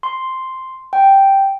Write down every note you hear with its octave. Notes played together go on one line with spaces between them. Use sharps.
C6
G5